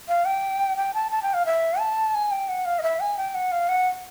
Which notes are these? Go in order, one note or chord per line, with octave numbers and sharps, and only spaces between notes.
F5
G5
G5
A5
A5
G5
F5
E5
A5
G#5
G5
F#5
F5
D#5
E5
G#5
G5
F#5
F5
F#5